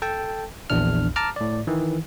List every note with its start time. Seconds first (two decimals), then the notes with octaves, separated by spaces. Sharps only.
0.02 A4 G5 A5
0.70 A#1 E2 D4 F6
1.16 A5 A#5 D6 F6
1.36 A2 D5
1.67 D#3 E3